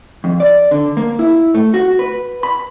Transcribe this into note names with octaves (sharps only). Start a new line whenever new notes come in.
F2
D5
D3
A#3
E4
A3
F#4
B4
B5